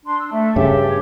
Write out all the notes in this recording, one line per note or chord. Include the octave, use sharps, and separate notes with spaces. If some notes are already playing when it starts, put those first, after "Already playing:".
D4 C6
E6
A3 A4 E5
G2 C#3 G4
C#5